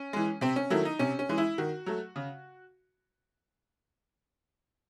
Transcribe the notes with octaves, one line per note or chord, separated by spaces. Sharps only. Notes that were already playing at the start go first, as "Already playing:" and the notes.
Already playing: C#4
E3 G#3
C3 C4
C#4
D#3 F#3 A3 E4
D#4
C3 C#4
C#4
E3 G#3
E4
D#3 F#4
F#3 A3
C#3